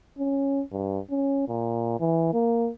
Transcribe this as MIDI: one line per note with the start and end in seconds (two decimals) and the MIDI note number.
0.19 0.62 61
0.72 0.99 43
1.11 1.47 61
1.48 1.99 46
2.00 2.31 52
2.33 2.69 58